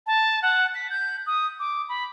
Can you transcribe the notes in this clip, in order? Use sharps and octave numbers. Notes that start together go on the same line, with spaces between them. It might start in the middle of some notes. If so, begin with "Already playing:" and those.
A5
F#5
B6
G6
D#6
D6
B5